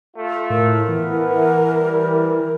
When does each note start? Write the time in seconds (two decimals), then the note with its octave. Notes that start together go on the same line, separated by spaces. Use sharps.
0.16 A3 F4
0.50 A2 A#4
0.88 E3 B3
1.78 G3